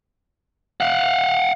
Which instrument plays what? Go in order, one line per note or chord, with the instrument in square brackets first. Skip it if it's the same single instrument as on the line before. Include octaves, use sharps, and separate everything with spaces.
[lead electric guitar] F5 F#5